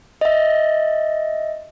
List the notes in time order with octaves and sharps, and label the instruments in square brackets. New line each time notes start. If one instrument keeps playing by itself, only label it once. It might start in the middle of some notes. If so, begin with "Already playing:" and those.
[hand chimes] D#5 E5